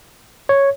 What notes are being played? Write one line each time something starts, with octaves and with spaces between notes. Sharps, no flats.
C#5